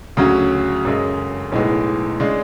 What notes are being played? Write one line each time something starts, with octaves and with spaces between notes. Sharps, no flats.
D2 C#3 F#3 C#4 F#4
F#2 C#3 G#3
B1 A2 G#3 B3
C#3 G#3 D4